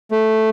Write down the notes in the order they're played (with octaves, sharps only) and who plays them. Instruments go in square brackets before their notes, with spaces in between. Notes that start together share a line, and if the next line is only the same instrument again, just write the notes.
[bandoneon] A3